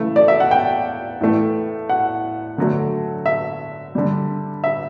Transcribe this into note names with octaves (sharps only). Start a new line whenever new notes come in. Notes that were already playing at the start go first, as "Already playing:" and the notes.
Already playing: C#3 E3 A3
D5
E5
F#5
G5
A2 E3 A3
F#5
D3 F#3 A3
E5
D3 G3
E5